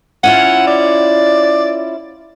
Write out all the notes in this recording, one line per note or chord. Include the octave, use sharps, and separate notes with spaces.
C#4 E4 F4 F#5
D5